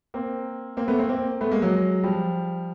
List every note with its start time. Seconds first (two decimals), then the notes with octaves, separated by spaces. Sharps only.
0.14 A#3 C4
0.77 A#3 C4
0.88 A3 B3
0.99 A#3 C4
1.09 A#3 C4
1.41 A3 B3
1.52 G#3 A#3
1.62 F#3 G#3
2.03 F3 G3